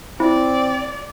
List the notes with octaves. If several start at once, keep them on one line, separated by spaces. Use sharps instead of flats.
C4 E4 D5